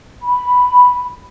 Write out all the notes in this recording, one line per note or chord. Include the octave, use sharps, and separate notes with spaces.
B5